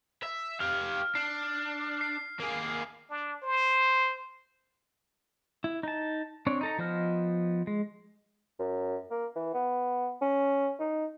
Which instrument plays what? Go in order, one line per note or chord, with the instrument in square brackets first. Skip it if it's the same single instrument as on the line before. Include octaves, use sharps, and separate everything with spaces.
[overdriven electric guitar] E5
[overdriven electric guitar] G4 F5 [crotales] F6
[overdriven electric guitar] D4 [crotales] C7
[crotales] C7
[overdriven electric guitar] A#3 G#4
[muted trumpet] D4
C5
[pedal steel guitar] E4
D#4 A5
C4 D4 C#5
D#4 A4 A#5
F3 B3 C5 D#5 F6
G#3
[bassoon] F#2
A#3
E3
B3
C#4
D#4